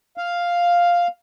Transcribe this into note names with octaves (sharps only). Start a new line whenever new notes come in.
F5